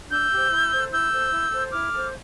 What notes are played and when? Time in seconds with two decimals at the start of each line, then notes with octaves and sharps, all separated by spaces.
0.10 D4 E6 G6
0.30 G4 C5
0.51 E4
0.71 A4 C5
0.90 E4 E6 G6
1.11 A4 C5
1.31 E4
1.51 A4 C5
1.71 E4 D6 F6
1.92 A4 C5